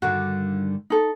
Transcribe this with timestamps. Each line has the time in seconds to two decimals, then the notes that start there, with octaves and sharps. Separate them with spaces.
0.02 G2 D3 D#3 F#4
0.90 D#4 A4